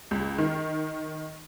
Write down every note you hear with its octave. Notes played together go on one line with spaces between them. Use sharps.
C#2
D#3